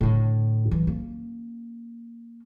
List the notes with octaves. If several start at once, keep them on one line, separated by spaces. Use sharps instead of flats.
A2 D3
E3 F#3
A#3 C#4